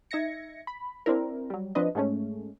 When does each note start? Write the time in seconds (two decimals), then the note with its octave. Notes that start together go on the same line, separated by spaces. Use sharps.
0.11 D#4 E5 G#6 A#6 C#7
0.67 B5
1.06 C4 D4 E4 A#4
1.50 F#3 G3
1.75 F3 C4 D4 B4 D#5
1.95 G#2 G#3 A3 C#4